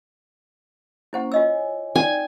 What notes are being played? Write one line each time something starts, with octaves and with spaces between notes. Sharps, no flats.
A#3 C#4 E4 C5 F#5
F4 C#5 D#5 G#5 E6
D#4 D5 G5 G#5